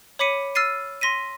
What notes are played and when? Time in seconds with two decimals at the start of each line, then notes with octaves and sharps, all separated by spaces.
0.19 C#5 B5 D6 B6 C#7 D#7
0.55 E6 F6 A6 C7 D#7
1.01 C6 A#6 B6 D#7